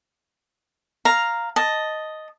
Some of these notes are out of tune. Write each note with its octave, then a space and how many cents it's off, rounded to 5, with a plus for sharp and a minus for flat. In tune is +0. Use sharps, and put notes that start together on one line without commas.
F5 +0 A#5 +0
D#5 +0 A5 +0